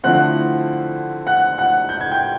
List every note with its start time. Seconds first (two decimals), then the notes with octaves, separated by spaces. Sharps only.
0.03 D3 F3 A3 C4 E4 F#5 F#6
1.27 F#5 F#6
1.58 F#5 F#6
1.89 G6
2.01 G#6
2.11 G5 G6